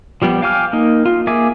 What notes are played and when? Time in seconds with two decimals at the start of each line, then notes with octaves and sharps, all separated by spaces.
0.22 F3 G3 B3 G4
0.42 F5 G5 G#5 D6 F6
0.73 A#3 D#4
1.06 F4
1.27 A#3 G#4 E5 G#5 D6